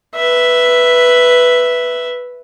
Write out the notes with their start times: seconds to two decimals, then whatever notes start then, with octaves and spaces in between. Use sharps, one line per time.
0.15 B4 E5